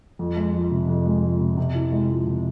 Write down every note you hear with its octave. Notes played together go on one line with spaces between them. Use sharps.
F2
G#3
F3
C3
F2
G#3
F3
C3
C3
E4
G#3
F3
C3